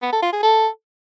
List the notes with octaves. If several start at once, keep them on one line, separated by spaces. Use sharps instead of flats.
B3
A4
F4
G#4
A4